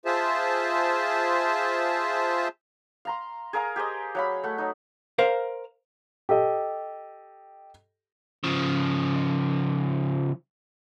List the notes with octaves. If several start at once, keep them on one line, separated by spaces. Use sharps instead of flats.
F4 G#4 C5 E5 A5
F5 A#5 C6
G#4 A#4 F5 A#5
G4 G#4 C5 D#5
F#3 F5 B5
A3 F#5
F#3 D#4
A#4 C5 F5
G4 A4 D#5
C#3 F3